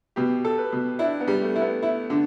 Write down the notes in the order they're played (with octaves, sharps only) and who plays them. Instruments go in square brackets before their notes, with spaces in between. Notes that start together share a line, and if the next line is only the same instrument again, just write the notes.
[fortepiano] B2 [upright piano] G4
[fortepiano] A4
[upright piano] B4
[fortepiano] B2
[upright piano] D4 [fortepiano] E4
[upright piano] B3
[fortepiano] G3
[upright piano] A3
[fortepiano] E4
[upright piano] B3
[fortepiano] E4
D3